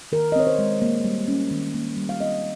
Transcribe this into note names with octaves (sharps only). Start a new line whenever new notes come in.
D#3 A#4
D#5
C4 C#5
C5
G#3
A#3
G3
C#4
D#3
A#3
G3
F5
C4 D#5